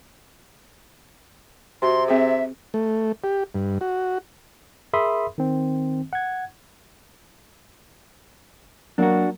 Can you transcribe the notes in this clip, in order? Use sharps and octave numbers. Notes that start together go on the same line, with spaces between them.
C3 F#4 C6
C4 G#4 E5
A3
G4
G2
F#4
G#4 A#4 E5 B5 C6 D#6
D#3 C4
F#5 G#6
F#3 A#3 D4 F#4